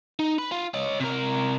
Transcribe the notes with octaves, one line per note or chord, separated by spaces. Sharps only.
D#4
B4
F4
C#5 D#5
C3 A#4